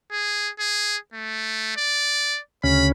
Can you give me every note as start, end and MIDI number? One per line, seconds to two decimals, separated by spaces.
0.12 0.49 68
0.59 0.97 68
1.14 1.75 57
1.76 2.39 74
2.64 2.92 38
2.64 2.92 49
2.64 2.92 61
2.64 2.87 83